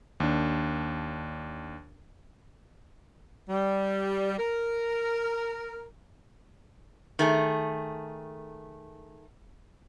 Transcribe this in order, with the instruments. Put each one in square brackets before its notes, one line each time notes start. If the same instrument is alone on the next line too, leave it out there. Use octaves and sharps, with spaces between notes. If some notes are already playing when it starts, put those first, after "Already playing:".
[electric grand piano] D#2 D4
[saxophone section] G3
A#4
[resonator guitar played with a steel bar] D#3 A3 G#4